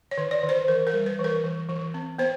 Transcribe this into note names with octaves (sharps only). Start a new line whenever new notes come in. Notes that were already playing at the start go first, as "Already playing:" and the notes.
C#5
D#3
D5
D#3
C5
E3 A#4
A#4
G3
B4
E3
A#4
E3
E3
C4
B3 C5